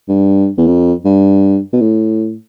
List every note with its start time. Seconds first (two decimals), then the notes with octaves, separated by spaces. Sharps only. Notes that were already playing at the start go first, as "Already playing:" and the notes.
0.08 G2
0.58 E2
0.67 F2
1.05 G2
1.73 B2
1.81 A2